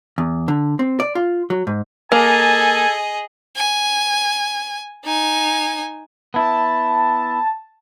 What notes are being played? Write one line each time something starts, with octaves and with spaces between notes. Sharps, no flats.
E2
D3
C4
D5
F4
F#3
G#2
A#3 G#4 A4 D#5 G#5
G#5
D#4 G#5
B3 E4 A5